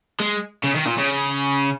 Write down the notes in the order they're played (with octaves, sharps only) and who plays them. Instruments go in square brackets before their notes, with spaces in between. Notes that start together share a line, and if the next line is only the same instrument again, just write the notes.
[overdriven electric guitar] G#3
C#3
D#3
A#2
C#3